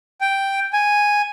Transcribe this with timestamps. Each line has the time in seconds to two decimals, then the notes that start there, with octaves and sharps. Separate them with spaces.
0.21 G5
0.73 G#5